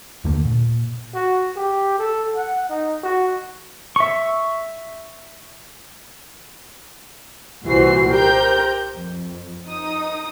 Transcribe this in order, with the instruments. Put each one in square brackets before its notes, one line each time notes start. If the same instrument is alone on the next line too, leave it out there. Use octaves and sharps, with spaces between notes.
[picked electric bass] D#2 D3 A3 A#3
A#2
[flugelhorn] F#4
G4
A4
F#5
D#4
F#4
[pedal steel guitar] E5 C#6
[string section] C2 A#2 E3 F#4 C5 C7
G4 A#4 C5 G5 A#5 G6
F2
D#4 D#6